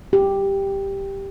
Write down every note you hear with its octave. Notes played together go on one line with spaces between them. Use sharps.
G4